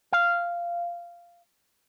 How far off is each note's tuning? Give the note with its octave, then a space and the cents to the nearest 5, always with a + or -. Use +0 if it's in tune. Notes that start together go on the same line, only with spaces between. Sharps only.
F5 -10